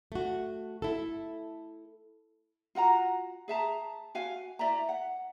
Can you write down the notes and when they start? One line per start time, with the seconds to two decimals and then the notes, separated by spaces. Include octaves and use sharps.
0.12 A3 F#4
0.82 E4 A4
2.75 F4 F#4 F#5 A#5
3.48 G#4 E5 A5 A#5
4.15 F#4 F5 G#5
4.59 E4 D5 E5 A#5
4.89 F#5